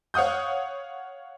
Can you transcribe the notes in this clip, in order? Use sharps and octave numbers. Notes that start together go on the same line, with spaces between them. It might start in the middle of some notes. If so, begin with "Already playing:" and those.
C#5 F5 F#5 D#6 G6